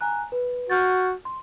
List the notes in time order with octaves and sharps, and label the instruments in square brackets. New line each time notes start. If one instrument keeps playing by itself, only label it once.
[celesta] G#5 A#5 F#6
B4
[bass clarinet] F#4 [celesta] F6 G6 A6
[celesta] C6